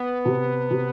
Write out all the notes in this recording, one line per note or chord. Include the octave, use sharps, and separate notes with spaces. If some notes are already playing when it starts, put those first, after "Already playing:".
Already playing: B3
C3
C3